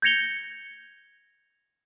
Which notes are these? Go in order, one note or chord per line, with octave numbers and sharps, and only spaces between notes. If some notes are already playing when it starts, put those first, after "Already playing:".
G6 G#6 A#6 C#7 F7 G7